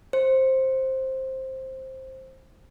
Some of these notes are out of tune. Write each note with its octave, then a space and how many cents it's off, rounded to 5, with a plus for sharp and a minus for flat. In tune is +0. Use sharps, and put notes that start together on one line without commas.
C5 +10